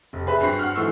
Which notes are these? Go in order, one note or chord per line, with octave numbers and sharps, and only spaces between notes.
F1
G#4 B4 E5 B5
G2 C4 F#4 C7
F#5 F6
G#2 E3 A3 C#6 E6 C7